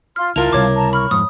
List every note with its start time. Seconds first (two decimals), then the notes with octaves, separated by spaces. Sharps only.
0.16 F4 C6 F6
0.36 C#2 E4 F4 A#4 A5 F7
0.53 C#2 C3 G3 C#5 D6
0.75 A5 A#5
0.93 B5 C#6 F6
1.11 F2 G#2 D#6